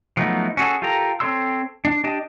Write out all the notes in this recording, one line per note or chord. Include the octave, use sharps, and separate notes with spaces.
F3 F#3 A3 B3 D#4
C#4 F#4 G#4 A4
F4 G4 A4 A#4 A#5
C4 A4 C#5 C6 E6
D4
D4 G4 D#5 A5